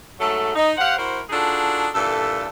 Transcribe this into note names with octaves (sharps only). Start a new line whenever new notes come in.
G#2 F#3 A3 A4
D#4
G4 C5 F5 F#5
E4 F#4 A#4 C5
D4 D#4 F4 F#4 G#4 A4
G2 A#2 E3 A4